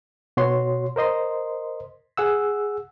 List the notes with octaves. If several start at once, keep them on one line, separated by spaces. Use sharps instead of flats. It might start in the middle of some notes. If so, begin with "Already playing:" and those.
B2 F#4 C#5 C6
A#4 C5 D#5 C6
G#4 F#5 E6